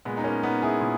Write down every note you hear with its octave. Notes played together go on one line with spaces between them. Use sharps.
A#2 G#3 B3
D#4
A#3 C#4
B3 D#4
E4 G#4
A#2